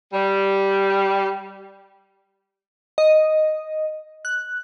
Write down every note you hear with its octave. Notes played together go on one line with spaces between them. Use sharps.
G3
D#5
F#6